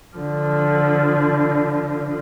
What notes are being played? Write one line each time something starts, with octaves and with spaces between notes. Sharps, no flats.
D3 F3